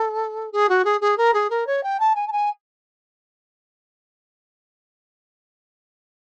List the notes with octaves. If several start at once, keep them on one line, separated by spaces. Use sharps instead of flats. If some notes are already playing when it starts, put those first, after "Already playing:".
Already playing: A4
G#4
F#4
G#4
G#4
A#4
G#4
A#4
C#5
G5
A5
G#5
A5
G#5